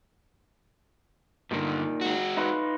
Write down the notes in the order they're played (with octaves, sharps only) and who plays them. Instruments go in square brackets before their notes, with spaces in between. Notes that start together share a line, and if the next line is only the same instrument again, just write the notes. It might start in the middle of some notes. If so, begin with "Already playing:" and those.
[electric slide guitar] G2 D3 [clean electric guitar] A#2 D#3
[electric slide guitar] G#3 F#4
[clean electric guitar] D#4 F4 B4